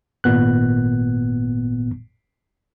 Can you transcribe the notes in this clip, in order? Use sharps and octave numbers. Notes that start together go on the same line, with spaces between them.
G#1 A#2 B3 F#6